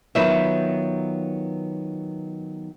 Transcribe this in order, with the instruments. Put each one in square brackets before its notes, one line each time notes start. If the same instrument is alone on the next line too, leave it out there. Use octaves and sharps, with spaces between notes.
[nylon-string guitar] D#3 F#3 B3 F4 B4 E5